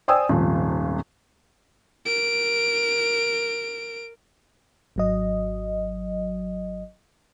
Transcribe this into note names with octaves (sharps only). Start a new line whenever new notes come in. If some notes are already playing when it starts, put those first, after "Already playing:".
C5 D5 G5 G#5 D#6 E6
D#1 G#1 F3
A#4 D7
G#1 F#3 D#5